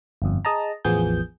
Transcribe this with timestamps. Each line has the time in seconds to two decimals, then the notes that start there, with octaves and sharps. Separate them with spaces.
0.22 G1 F2
0.45 G#4 D#5 A5 A#5
0.85 A1 E2 F3 B3 G#4 G6